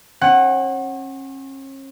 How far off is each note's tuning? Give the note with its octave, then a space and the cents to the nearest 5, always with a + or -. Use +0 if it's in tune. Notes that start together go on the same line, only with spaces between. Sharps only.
C#4 -40 F#5 +10